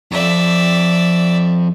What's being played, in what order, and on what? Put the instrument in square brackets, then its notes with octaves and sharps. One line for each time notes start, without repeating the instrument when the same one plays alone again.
[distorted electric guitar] F2 F3 [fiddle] D5 E5